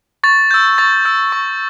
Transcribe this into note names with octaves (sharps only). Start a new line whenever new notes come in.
C#6 A6
E6 G6
C#6 A6
E6 G6
C#6